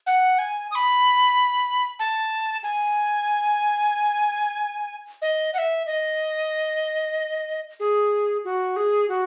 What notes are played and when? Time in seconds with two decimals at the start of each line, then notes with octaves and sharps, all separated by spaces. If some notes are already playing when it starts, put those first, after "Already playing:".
0.07 F#5
0.39 G#5
0.71 D#6
0.75 B5
1.99 A5
2.63 G#5
5.22 D#5
5.54 F#5
5.58 E5
5.86 D#5
7.80 G#4
8.44 F#4
8.76 G#4
9.09 F#4